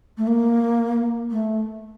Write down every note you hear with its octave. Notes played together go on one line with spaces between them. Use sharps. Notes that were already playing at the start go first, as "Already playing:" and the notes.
A3
A#3
A3